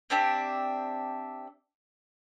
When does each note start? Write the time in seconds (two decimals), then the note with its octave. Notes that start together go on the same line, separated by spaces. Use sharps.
0.10 C4 D4 G4 E5